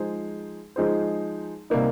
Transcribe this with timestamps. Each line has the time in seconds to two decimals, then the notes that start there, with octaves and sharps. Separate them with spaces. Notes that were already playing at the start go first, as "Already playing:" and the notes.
Already playing: F3 G#3 D#4 G#4 C5
0.76 F3 G#3 D#4 G#4 C5
1.70 C3 G3 A#3 D#4